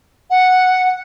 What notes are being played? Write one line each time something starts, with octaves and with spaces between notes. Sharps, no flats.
F#5